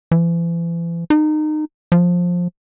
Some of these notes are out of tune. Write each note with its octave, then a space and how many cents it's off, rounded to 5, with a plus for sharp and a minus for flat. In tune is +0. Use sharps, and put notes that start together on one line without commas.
E3 +40
D#4 -25
F3 +15